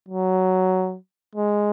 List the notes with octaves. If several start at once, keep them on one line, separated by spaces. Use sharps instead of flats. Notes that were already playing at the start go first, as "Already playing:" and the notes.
F#3
G#3